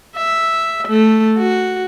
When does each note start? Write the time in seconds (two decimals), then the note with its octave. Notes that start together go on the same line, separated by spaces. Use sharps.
0.17 E5
0.88 A3
1.37 F#4